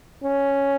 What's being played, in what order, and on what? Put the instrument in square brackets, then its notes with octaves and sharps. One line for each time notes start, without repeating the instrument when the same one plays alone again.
[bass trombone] C#4